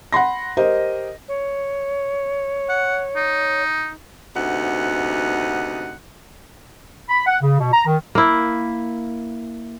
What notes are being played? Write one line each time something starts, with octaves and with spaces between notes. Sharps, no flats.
F#5 B5 C6 A#6
G4 A#4 C5 D#5
C#5
F#5
D#4
D2 C3 B3 D#4 F#5
B5
F#5
C#3
B2
A#5
D#3
A#3 E4